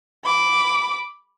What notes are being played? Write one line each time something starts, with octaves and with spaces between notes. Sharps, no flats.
B5 D6